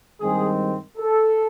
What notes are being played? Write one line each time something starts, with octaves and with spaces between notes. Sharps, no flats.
G2 D#3 G#3 C4 G#4
A4